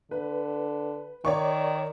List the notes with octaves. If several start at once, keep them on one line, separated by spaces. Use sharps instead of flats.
D3 B4
D#3 C#5 D5 C#6